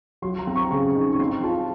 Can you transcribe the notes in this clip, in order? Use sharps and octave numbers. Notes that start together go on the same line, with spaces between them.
F#3 C6
A#5
C4
C#6
C#3 C#6
D#4
C#6
C4 C6
F4 A5